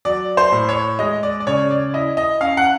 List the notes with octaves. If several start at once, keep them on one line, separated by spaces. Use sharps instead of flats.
F#3 D5
C5
A2
C#5
G#3 D#5
D5
D5
C#3 C#5
D5
E4 D#5
D#5
C#4 F5
F#5